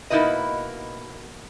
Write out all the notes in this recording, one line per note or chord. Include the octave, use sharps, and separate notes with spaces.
B2 A#3 D#4 E4 B4 D#5